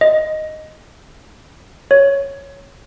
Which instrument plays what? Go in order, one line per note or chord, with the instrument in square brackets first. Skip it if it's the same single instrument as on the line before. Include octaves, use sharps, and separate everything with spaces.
[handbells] D#5
C#5